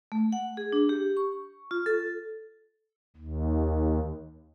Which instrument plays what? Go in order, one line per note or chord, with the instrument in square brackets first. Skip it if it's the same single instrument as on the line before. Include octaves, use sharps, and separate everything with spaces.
[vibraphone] A3
F#5
G#4
D4
G4
C#6
F4
A4
[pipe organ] D#2